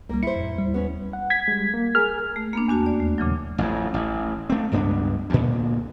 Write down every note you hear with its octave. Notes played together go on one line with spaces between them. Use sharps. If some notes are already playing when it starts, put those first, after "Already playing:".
C2 G3 A#3
E4 C5 C#7
F2 A2
D#2 G3
B3 C#4
F#5
G#6 B6
G3 G#3
A#3
G#4 A#4 G#5 F6
A3
A#3 B3 D4
E2 D4 F#4 A5
D#2 D5
A3
A#2 C#3 E3 F#3
A1 F2
A1
A3 C4
C#2 G2 B3 D4
D2 A#2